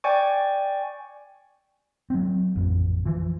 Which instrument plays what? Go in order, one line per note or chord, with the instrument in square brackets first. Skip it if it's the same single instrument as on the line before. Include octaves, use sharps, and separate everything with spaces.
[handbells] D5 G5 G#5 C#6
[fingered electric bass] F#3 C4
A1 F2
E3 F3